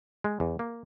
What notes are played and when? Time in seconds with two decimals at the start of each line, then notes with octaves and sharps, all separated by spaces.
0.24 G#3
0.40 E2
0.59 A#3